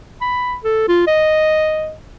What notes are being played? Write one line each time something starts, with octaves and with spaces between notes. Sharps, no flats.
B5
A4
F4
D#5